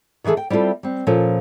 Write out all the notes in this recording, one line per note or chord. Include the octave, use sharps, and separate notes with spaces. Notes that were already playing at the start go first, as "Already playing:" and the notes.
D#3 E3 D#4 G#4 A4
G5
G3 C4 E4 F4 A4
G3 C4
A#2 F3 C#4 A4